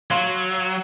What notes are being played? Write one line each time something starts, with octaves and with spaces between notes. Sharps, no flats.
F#3 F5 C6